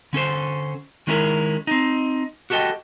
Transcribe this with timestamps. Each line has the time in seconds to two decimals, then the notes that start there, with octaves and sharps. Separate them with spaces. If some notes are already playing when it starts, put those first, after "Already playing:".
0.13 D3 C#4 A4 C5
1.07 D#3 G#3 C#4 E4 A4 A#4
1.67 C4 D#4
2.50 F#4 G4 A4 C#5 D#5 G5